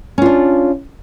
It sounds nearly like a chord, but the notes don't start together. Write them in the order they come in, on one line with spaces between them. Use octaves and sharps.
C#4 F4 D4